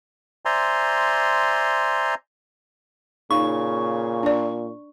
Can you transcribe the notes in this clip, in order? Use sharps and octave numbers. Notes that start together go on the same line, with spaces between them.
C5 D5 E5 G#5 A#5 C6
A#2 C#3 D#4 F5 C#6
D4 D5